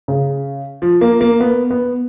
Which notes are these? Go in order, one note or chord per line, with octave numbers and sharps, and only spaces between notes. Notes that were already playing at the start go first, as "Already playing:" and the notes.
C#3
F3
A#3
A#3
B3
B3